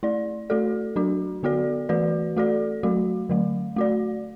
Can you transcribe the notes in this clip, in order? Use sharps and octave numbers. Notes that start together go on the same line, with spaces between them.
A3 E4 D5
A3 F#4 A4 D5
F#3 D4 F#4
D3 B3 F#4 A4 D5
E3 A3 F#4 B4 D5
A3 F#4 A4 D5
F#3 A3 F#4
D3 F#3 A3
A3 F#4 D5